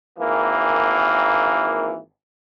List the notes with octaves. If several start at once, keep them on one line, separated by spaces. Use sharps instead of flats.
G#1 E3 A#3